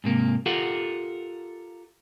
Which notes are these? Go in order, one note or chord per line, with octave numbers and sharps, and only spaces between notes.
G#2 C3 A#3
F4 G4 A4 A#4 F5 F#5